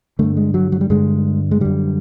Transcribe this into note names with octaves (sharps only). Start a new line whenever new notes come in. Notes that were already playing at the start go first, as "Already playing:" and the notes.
G2 D3 A3
G#3
F#3
F#3
G3
G2 D3 G#3
G#3
F#2 D3 G3